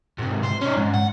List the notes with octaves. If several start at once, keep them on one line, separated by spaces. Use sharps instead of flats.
G#2 C3
C5
C#4 D#4
G#2
F#5